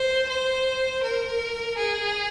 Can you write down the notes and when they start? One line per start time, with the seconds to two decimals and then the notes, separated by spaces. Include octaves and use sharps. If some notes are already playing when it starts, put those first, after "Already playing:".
Already playing: C5
0.29 C5
1.04 A#4
1.78 G#4